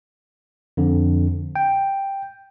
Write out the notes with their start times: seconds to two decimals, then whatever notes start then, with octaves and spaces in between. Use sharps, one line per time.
0.77 F2 D3
1.56 G5